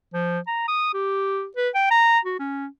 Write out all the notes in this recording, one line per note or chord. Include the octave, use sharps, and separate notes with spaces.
F3
A#5
D#6
G4
B4
G5
A#5
F#4
C#4